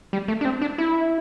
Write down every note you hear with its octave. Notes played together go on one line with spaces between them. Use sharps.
G3
A3
D4
C4
D4
E4